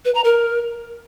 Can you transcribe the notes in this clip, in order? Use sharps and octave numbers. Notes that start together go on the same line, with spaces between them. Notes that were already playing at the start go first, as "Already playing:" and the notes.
B4
A#5
A#4